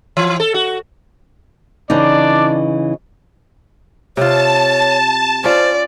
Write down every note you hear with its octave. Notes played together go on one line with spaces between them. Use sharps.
E3
A4
F#4
C#3 E3 D4 D#4 D5
C3 F4 C#5 A5
C#4 F4 C5 D5